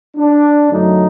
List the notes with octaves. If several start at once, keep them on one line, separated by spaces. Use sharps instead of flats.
D4
F#2 D3 F#3 A3 D#4